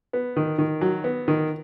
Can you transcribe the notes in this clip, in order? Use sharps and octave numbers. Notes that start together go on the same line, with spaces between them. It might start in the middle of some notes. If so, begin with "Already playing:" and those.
B3
D#3
D#3
F#3
B3
D#3